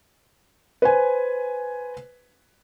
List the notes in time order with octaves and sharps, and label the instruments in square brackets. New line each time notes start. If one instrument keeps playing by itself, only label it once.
[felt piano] B4 C5 G#5